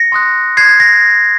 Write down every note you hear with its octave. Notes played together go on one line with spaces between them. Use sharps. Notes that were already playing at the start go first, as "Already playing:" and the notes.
Already playing: A#6 C#7
C6 D#6 F#6
C6 F#6 G#6 C7
G#6
A#6